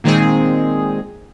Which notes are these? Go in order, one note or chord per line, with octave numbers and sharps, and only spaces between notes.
A#2 D#3 G#3 C4 G#4